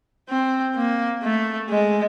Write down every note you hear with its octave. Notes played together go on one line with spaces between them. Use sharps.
C4
A#3
A3
G#3